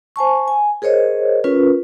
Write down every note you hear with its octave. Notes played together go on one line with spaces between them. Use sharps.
C5 G#5 A5 C#6
G#5
G#4 A#4 C5 C#5 D#5
C#4 F4 A#4 B4